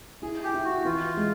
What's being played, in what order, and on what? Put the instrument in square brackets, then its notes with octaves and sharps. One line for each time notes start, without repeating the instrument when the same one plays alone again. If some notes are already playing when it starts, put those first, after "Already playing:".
[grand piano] E4 [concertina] G#4
[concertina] G4
[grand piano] E4
[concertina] F#4
[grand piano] E3 [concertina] F4
[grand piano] G#3